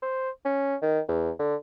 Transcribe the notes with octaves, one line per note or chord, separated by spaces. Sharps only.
C5
C#4
D#3
E2
D3